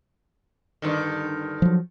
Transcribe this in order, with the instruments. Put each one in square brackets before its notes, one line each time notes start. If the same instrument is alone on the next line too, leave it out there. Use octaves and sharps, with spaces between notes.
[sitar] G2 D3 D#3
[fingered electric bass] F3 F#3